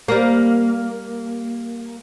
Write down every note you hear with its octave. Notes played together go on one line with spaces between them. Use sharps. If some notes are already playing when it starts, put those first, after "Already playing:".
G3 A#3